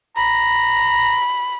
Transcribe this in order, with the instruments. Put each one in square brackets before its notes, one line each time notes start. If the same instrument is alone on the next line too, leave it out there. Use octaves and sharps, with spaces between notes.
[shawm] A#5 [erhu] B5